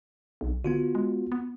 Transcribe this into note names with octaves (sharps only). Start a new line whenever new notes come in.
B1
D3 B3 F4 F#4
G#3
B3